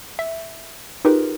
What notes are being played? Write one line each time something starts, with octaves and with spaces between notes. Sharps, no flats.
E5
D#4 F4 G4 G#4 A#4 B4